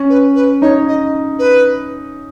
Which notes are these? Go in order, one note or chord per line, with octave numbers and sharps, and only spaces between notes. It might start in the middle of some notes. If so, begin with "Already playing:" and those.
Already playing: C#4
B4
B4
D#4 C#5
D#5
B4